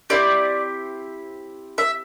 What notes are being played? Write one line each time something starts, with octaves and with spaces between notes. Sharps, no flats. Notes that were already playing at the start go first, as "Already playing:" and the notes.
C4 E4 G4 D5
E5